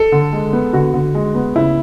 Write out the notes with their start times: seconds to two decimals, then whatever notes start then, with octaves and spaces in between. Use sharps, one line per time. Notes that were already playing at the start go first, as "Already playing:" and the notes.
Already playing: A4
0.12 D3
0.32 G#3
0.53 B3
0.73 D3 F#4
0.94 D3
1.14 G#3
1.35 B3
1.55 C#3 E4